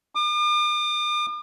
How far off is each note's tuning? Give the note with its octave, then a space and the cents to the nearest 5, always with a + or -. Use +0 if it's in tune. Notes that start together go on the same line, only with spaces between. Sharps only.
D6 +45